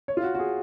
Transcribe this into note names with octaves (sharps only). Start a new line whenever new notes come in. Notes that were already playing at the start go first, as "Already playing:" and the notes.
C#5
F4
F#4
F#4
G#4